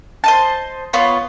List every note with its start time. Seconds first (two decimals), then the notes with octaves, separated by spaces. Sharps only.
0.24 C5 D#5 A5
0.93 B3 F4 C#5